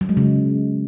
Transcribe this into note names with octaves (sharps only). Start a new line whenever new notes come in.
F#3
G#3
C#3